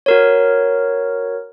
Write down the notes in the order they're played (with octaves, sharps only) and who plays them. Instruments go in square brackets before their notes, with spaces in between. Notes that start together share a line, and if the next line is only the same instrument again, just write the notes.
[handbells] F#4 A#4 C#5